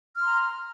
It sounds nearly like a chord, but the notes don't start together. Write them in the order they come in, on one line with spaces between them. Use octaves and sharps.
F6 C6 A#5